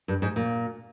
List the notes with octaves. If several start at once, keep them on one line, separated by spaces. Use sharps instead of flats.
G2
G#2
A#2